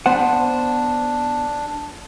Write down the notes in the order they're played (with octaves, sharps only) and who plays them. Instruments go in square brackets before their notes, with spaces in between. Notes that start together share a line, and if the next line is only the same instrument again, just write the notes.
[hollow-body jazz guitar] B3 C5 F#5 [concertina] D4